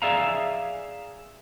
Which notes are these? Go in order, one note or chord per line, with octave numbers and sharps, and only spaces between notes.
G#4 D5 E5 F5 A#5